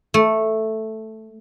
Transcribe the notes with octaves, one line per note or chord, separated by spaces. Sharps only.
A3